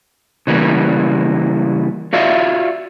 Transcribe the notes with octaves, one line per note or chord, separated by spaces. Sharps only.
C#3 E3 G3 A#3
F4 F#4 D5 E5 F5